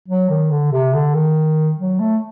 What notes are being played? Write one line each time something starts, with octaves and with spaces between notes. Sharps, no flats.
F#3
D#3
D3
C3
D3
D#3
F#3
A3